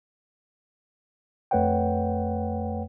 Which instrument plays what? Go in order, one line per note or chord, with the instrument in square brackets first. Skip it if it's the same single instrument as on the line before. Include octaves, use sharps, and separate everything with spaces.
[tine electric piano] F2 A3 B4 C#5 F#5 G5